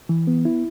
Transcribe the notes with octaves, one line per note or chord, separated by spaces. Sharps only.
E3
B3
E4